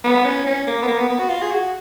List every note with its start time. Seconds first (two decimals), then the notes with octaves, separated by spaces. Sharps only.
0.04 B3
0.25 C#4
0.46 C#4
0.67 A#3
0.82 B3
0.87 A#3
0.98 B3
1.09 B3
1.19 F#4
1.29 F4
1.42 G#4
1.51 F#4